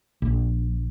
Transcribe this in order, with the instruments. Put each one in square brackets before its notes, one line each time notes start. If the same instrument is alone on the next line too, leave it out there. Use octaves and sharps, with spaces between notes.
[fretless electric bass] A#1